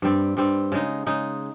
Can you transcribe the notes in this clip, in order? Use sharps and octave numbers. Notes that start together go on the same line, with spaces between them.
G2 G3 C4
G2 G3 C4
C#3 G#3 D#4
C#3 G#3 D#4